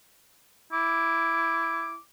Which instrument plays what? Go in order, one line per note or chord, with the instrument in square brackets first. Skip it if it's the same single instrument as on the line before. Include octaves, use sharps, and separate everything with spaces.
[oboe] E4 [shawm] D6